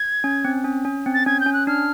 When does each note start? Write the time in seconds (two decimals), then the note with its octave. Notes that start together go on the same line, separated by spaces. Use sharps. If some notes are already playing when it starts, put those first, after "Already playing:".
Already playing: G#6
0.24 C#4
0.45 C4
0.64 C#4
0.85 C#4
1.06 C4
1.14 A6
1.26 C#4 G#6
1.40 G6
1.46 C#4
1.53 F#6
1.67 D4 F6